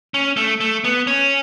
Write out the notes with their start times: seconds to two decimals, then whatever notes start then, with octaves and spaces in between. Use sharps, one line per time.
0.14 C#4
0.37 A3
0.60 A3
0.84 B3
1.07 C#4